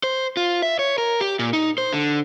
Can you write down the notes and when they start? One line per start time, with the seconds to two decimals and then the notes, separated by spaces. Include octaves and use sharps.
0.03 C5
0.37 F4
0.62 E5
0.79 C#5
0.98 A#4
1.20 G4
1.39 A#2
1.53 D#4
1.78 C5
1.93 D3